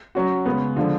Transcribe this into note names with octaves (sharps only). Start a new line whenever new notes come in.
F#3 C#4 F#4
C#3 G#3 B3
D3 F3 G#3